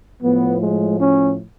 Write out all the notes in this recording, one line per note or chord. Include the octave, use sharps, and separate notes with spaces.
A2 F3 B3
G#3
C#4